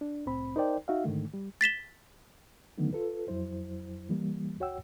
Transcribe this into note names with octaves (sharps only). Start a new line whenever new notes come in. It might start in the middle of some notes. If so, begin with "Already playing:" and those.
D4
C2 A2 C4 B5
D#4 A#4 C5 D5 G5
D#4 F#4 E5 F5
G#2 D3 D#3 A3
G3
A6 B6 E7 G7
D3 D#3 F#3 A3 B3 D#4
F4 A4 B4
F2 F#3 E4 C5
E3 G3 A#3
D2 F#4 C#5 F#5 G5 E6